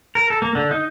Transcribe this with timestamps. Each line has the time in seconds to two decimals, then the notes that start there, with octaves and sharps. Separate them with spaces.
0.15 A#4
0.30 A4
0.42 A#3
0.55 D3
0.71 D#4